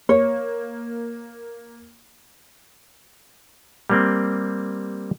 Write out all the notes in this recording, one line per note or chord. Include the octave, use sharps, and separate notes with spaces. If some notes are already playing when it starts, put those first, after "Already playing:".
A#3 C#5
G3 A#3 C4